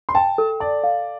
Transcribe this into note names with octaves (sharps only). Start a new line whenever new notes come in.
C6
G5 A5
A4
D5 A5
F5